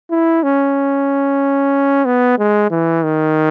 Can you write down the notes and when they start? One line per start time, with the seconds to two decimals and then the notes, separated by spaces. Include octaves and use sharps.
0.11 E4
0.43 C#4
2.05 B3
2.38 G#3
2.71 E3
3.03 D#3